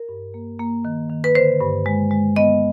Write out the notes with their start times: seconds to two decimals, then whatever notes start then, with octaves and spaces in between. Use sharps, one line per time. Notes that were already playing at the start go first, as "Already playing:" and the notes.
Already playing: A#4
0.09 G2
0.34 A#3
0.59 A#3
0.85 D#3
1.10 D#3
1.24 B4
1.35 D3 C5
1.61 G2
1.86 G#3
2.11 G#3
2.36 B3 D#5